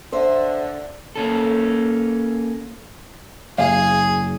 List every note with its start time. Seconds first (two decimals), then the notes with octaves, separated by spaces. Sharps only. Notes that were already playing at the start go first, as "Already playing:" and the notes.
0.12 D3 C5 E5
1.16 A#3 C#4 A4
3.58 F#1 G#4 F5